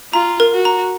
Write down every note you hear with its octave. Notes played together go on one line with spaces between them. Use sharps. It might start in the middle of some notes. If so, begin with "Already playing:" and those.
F4 A#5
A#4
F#4
A#5